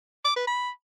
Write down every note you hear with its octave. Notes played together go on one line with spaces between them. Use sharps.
D6
B4
B5